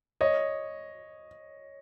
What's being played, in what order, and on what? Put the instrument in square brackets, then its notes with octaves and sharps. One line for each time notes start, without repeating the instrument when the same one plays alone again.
[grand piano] C#5 D#5